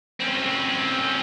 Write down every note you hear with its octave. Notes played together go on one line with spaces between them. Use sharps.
C4 C#4